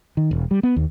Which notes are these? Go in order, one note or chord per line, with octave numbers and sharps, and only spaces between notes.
D#3
E1
G3
B3
D#2